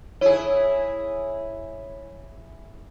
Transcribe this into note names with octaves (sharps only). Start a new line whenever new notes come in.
E4 G#4 C#5